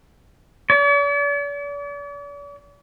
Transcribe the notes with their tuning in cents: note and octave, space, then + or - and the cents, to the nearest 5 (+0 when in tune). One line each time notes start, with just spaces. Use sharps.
D5 -45